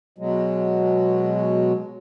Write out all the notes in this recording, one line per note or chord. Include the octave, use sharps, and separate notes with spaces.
B2 F#3 G#3